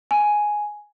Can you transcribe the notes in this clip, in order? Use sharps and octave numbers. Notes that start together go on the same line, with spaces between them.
G#5